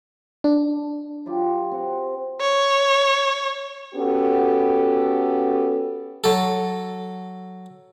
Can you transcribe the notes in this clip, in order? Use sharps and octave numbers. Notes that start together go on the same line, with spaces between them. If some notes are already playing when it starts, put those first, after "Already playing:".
D4
F#3 F4 G4
C4 F#5
C#5
B3 C#4 F#4 G4 A4
F#3 A4